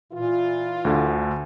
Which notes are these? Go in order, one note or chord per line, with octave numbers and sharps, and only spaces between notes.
A#2 E3 F4
D2 D3